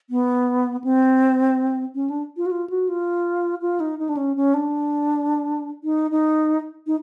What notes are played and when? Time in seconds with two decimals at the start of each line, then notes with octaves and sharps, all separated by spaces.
0.10 B3
0.84 C4
1.95 C#4
2.10 D4
2.37 F4
2.46 F#4
2.51 F4
2.70 F#4
2.89 F4
3.62 F4
3.80 D#4
3.99 D#4
4.09 D4
4.17 C#4
4.36 C#4
4.54 D4
5.84 D#4
6.11 D#4
6.87 D#4